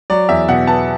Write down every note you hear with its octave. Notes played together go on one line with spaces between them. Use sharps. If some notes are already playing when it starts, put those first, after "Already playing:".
F#3 D5
E2 E5
B2 F#5
B3 A5